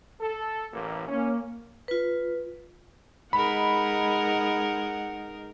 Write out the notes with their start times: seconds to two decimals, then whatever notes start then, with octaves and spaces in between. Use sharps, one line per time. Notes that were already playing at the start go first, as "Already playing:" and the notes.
0.21 A4
0.73 A1 A#3
1.08 A#3 C#4
1.88 F4 B4
3.33 G#3 D#4 A#4 F#5 B5